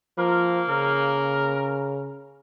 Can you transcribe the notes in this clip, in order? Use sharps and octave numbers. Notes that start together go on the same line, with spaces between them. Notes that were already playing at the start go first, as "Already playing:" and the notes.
F3 A#3 A#4
C#3 A#4